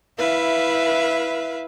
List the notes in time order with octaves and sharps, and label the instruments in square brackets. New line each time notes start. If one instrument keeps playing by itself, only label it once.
[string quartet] E4 B4 E5 F5